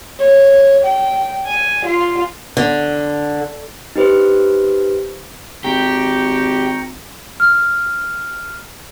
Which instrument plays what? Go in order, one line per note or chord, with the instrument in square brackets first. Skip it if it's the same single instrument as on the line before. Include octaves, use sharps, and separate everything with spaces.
[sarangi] C#5
G5
G#5
F4
[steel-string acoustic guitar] D3
[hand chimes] D#4 G4 B4 C5
[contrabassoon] G#1 [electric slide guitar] G4 [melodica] G5 A#5 C#6
[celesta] F6